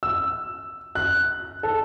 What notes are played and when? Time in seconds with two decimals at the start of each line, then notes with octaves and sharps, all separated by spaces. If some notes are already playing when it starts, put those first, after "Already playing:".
0.03 E6
0.95 F#6
1.63 A4